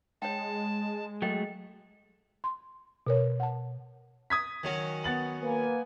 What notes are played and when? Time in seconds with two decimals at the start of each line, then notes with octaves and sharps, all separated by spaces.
0.22 G#3 C#5 G5 A5
1.22 F#3 A3 A4 D#5 G5
2.44 C6
3.07 B2 A#4 C#5
3.40 F#5 A5
4.30 D#6 G#6 B6
4.63 D#3 F#3 C#4
5.04 B3 A6 F#7
5.43 A#3 B4 G#5